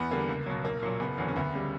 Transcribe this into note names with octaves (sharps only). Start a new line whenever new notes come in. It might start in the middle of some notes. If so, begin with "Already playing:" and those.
Already playing: E2 B3
D3 G3 A#3
C#2
B2 F#3
B1 A#3
A#2 F#3
F#1 B3
E2 D3 F#3
C#4
D2 B3
C#3 G3